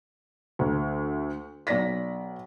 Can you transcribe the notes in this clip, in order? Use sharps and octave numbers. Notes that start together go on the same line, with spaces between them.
D2
B1 D5 A#6 B6